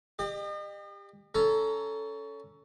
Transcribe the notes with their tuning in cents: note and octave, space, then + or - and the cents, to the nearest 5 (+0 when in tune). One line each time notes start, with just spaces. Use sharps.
G4 +25 D#5 -40
C#4 +20 A4 +0 A#5 +0